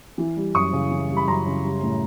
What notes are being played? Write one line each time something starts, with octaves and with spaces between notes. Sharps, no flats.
E3
G3
F#2 C#6 D#6
C#3
E3
G3
B5
F#2 A#5 C6
C#3
G3
A2